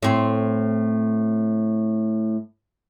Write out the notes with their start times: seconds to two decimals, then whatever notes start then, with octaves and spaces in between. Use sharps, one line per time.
0.03 A2 C4